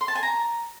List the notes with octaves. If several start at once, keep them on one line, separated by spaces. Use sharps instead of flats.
C6
A5
G#5
A#5